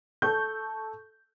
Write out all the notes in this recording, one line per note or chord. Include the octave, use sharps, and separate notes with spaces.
A4 C#6 G6